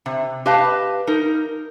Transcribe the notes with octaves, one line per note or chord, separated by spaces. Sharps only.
C3
G4 B4 D#5 F5 A5
D#4 A#4